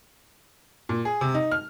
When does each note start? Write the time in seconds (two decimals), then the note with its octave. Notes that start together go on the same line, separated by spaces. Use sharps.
0.89 A#2
1.05 G#4
1.21 C3
1.34 D#4
1.51 F6